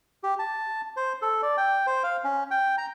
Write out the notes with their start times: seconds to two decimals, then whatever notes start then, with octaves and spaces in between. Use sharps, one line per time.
0.23 G4
0.39 A5
0.97 C5
1.22 A4
1.43 D5
1.58 G5
1.87 C5
2.04 F5
2.24 C#4
2.51 G5
2.78 A#5